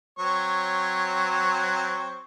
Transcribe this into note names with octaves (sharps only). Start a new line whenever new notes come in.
F#3 C4 C#5